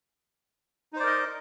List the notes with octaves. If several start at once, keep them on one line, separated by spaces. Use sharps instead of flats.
D#4 A#4 C5 D5 D#5